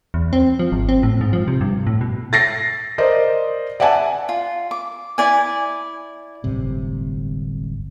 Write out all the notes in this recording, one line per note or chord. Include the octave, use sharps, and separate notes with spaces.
E2
C4
F3
G#1
C4
A2
G#2
F3
C3
G2
A2
B2
A6 A#6 C7
A#4 C5 D5 D#5
D5 E5 F#5 G#5 A5
F4
D6
E4 D5 G#5
D1 G1 C3